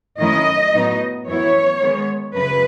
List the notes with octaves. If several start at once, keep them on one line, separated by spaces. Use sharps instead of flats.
F#2 D#3 A3 C#4 E4 D#5
A2 F#3 B3 D#4
F#2 E3 B3 E4 C#5
D#3 G#3 B3
F#2 C#3 B4